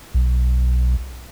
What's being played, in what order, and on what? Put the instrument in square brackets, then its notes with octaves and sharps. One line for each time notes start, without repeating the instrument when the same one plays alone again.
[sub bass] B1